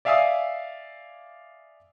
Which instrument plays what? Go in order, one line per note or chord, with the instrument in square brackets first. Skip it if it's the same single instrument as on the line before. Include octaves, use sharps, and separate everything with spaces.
[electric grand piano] D5 E5 F5 G#5 D#6 E6